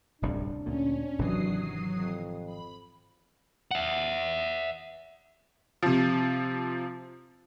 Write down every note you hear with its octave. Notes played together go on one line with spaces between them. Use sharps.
D1 C2 F#2 D4
D2 A#2 C#4
G#1 C3 E3 F#3 D#6 C7
F2
B5
E5 F#5
C3 F3